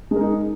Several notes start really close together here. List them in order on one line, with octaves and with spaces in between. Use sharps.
G#3 A#4 D#4